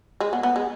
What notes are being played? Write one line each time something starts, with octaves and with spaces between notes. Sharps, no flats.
G#3
B3
B3
G#3